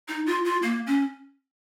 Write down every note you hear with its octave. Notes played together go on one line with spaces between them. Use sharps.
D#4
F4
F4
A#3
C#4